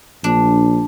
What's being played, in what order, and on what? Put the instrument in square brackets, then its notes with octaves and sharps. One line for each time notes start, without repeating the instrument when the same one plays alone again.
[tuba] A#1 [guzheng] D4